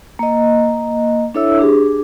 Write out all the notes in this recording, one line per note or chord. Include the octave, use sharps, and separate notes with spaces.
A#3 D#5
D4 E4 A4 C#5 E5 E6
D4 G4 G#4